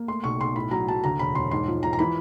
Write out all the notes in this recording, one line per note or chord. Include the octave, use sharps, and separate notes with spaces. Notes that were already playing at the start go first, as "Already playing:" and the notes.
Already playing: A#3
A3 C6
B1 C#6
B1 C6
A2 B5
F#3 A#5
F#3 A5
D2 A#5
E1 B5
E1 C6
G#2 C6
F3
F3 A#5
A#5
E3 B5